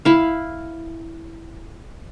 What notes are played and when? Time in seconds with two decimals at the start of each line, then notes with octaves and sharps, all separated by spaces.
0.05 E4 F5